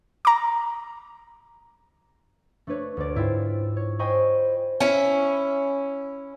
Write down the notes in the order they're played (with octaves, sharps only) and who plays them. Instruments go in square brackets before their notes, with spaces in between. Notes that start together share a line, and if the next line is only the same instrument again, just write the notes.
[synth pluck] A#5 D6
[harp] A3 D4 B4 C#5
D2 D5
G#2 E4 F4 G5
C#5
C5 D#5 G5 G#5 B5 C#6
[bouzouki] C#4 E4